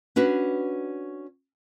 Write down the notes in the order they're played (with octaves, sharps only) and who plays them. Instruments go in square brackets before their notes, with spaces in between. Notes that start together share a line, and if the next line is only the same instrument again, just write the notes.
[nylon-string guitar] C#4 D4 F#4 B4